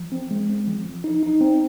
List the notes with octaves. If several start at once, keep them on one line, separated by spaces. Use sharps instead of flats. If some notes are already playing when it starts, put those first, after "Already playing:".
Already playing: F3
C4
G#3
C4
F3
F3
D#4
D#4
C4